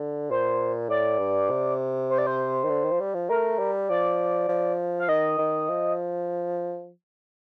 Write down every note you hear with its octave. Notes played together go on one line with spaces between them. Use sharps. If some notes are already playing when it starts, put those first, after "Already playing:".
Already playing: D3
A#2 C5
A2 D5
G2
C3
C5
D5
C5
D#3
D3
D#3
F3
G3
F3
A3 A#4
G3
F3 D5
F3
F5
D#3 D#5
D#3
F3